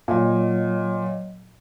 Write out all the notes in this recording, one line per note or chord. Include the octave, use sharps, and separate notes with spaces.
A#2 F#3 C#5 D#5